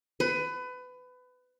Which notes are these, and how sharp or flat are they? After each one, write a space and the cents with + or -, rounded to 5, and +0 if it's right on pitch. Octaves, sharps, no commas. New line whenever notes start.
B4 +25